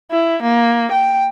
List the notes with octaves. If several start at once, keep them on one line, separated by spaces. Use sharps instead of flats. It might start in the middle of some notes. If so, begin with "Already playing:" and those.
E4
A#3
G5